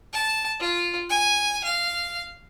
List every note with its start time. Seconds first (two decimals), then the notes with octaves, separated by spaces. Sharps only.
0.13 A5
0.60 F4
1.10 G#5
1.64 F5